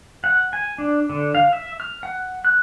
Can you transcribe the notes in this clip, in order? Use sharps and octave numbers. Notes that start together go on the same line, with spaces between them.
F#5
G#5
D4
D3
F5
E5
F6
F#5
F#6